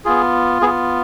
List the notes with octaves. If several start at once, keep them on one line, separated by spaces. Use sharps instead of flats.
B3 F4 G#4
B3 F4 G#4